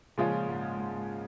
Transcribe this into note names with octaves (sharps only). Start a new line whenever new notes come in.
A#2 C#3 F3 G#3 C#4 F4
G#2
G#2
G#2